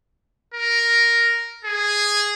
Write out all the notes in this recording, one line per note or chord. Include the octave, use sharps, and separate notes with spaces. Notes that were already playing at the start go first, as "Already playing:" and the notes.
A#4
G#4